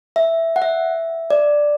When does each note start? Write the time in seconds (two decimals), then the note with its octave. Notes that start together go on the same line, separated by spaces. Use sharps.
0.16 E5
0.56 F#5
0.62 E5
1.30 D5